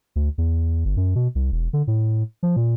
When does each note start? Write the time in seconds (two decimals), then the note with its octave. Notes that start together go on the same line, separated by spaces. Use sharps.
0.16 D2
0.38 E2
0.85 G1
0.97 F#2
1.15 B2
1.35 C2
1.52 E1
1.73 D3
1.87 A2
2.43 F3
2.56 A#2